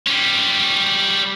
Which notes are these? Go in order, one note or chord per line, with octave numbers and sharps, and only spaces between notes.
G3 C#4